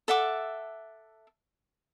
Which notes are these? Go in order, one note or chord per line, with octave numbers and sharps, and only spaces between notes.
A4 E5 F#5 D6